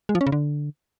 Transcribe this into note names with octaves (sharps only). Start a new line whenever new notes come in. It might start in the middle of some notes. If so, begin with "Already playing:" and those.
G#3
F3
C#4
C#3
D3